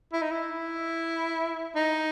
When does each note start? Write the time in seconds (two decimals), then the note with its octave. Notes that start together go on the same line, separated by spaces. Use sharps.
0.13 E4
0.22 D#4
0.32 E4
1.76 D#4